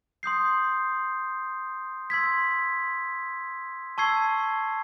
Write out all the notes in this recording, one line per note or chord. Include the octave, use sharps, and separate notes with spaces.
C6 D#6 G6 C7
C6 E6 G#6 B6
A5 C#6 E6 G#6 C7